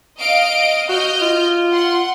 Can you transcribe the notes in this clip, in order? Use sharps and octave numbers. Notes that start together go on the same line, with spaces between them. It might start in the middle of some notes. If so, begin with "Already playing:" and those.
D#5 F5 D7
F#4 D#5 F6 G6
F4
F#5 C6